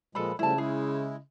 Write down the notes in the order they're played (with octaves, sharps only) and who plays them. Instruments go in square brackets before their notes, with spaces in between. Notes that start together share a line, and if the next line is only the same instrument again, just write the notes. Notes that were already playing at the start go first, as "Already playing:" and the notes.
[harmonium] A#2 F3 G#3 [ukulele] A4 B4 B5
[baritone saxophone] C#3 [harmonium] F3 G3 A3 [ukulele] E4 A5
[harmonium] G#3 E4 [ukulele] G#4